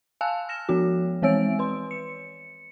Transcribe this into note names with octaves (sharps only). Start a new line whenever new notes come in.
F5 G#5 A5 E6 F#6
F6 A#6 E7
F3 B3 F#4
E3 G#3 C4 C#5 E6 D7
B4 C6
C#7